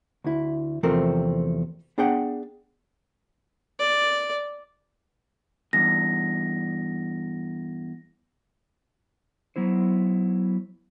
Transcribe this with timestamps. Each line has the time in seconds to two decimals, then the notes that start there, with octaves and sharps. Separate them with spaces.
0.24 D2 E4
0.83 E2 C3 F3 A3 C4 A#4
1.98 B3 D4 G#4 D5 F#5 G5
3.79 D5
5.73 E2 G2 A#6
9.56 F#3 B3 E4 C5